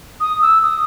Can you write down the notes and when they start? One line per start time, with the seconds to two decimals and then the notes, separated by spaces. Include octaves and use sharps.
0.20 D#6
0.42 E6
0.62 D#6